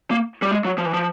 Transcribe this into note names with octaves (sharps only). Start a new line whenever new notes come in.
A#3
G3
G#3
F#3
F3
E3
F3